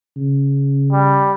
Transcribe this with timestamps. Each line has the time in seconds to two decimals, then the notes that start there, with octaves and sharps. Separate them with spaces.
0.17 C#3
0.92 G3